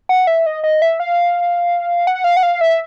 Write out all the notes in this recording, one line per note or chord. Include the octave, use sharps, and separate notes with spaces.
F#5
E5
D#5
D#5
E5
F5
F#5
F5
F#5
F5
E5